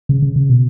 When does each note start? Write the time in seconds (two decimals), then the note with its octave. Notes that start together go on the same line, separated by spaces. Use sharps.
0.09 C#3
0.22 C#3
0.36 C#3
0.50 B2